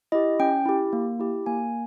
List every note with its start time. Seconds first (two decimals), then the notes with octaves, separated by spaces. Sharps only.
0.12 E4 G4 D#5
0.40 C#4 G5
0.65 E4 G4
0.93 A#3
1.19 E4 G4
1.46 A#3 G#5